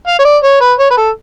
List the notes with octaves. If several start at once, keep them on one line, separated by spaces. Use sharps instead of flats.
F5
C#5
D5
C#5
B4
C#5
B4
A4